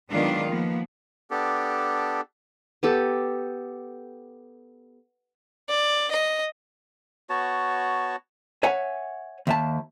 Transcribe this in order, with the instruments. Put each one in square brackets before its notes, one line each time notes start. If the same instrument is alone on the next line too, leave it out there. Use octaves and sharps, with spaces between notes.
[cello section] D#3 F#3 G#3 B3 D4 F4
F3 A#3 B3
[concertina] B3 D4 G4 A4
[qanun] B3 G4 A4
[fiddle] D5
D#5
[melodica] B3 F#4 C#5 A5
[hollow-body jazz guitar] C#5 E5 F#5 G#5
D#2 E5 A5